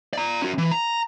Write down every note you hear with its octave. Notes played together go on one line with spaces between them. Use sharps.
D5 A#5
C#4 F#4
E3
A#5